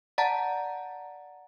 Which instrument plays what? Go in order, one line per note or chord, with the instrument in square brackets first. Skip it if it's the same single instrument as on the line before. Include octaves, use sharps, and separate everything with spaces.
[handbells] D5 F#5 A5 A#5 A6